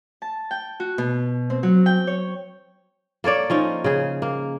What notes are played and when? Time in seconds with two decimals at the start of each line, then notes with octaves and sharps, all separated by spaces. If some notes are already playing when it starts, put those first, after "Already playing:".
0.22 A5
0.51 G5
0.80 F#4
0.98 B2
1.50 C4
1.63 F#3
1.86 G5
2.07 C#5
3.24 A#3 A4 C#5 D5
3.50 F3 C#4 D#4
3.84 C#3 G#4
4.22 A#3